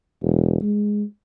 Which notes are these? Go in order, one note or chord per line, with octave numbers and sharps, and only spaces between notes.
E1
G#3